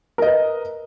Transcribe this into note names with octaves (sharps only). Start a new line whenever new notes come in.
A#4 B4 D#5